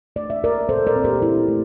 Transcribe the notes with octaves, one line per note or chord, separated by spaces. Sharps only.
A3 D5
E5
D4 A#4 D5
A#2 A4 C5
A#4 D5
C4
G4 A#4
A#2 E4
A3